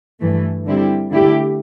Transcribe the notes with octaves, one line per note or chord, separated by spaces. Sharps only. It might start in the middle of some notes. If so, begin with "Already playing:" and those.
G2 E3 A3
D3 G3 C4 E4 G4
D3 A3 E4 G4